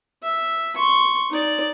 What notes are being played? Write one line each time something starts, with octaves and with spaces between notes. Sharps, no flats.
E5
C6 C#6
D#4 D5